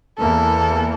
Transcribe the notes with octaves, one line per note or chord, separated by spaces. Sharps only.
E2 E3 A#3 A4